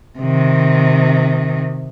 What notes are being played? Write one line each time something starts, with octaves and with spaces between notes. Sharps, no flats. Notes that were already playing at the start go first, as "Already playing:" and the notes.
C3 D#3